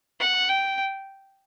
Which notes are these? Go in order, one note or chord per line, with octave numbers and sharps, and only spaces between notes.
F#5
G5